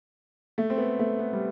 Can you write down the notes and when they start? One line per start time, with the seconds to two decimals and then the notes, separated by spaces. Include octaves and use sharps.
0.58 A3
0.70 C4
0.78 B3
0.99 A3
1.19 B3
1.33 G3